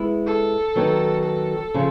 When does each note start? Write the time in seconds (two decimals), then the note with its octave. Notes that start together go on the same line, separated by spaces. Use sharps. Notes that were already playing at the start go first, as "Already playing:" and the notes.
Already playing: G#3 B3 E4
0.26 A4
0.76 D#3 F#3 B3 D#4
1.24 A4
1.74 C#3 F3